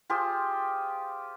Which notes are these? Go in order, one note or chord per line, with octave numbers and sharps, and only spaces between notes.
F4 G4 G#4 C5